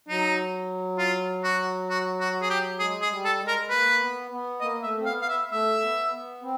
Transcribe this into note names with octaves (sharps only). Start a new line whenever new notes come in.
F#3 D#4
F4
F#4
F#4
F#4
G#4
G4
G#3 G#4
G#4
G3
A4
G#3
A#4
A#3 B4
B3
B3
A#3 D#5
A3 E5
C4
B3 F5
F5
E5
A3 E5
B3
B3
C4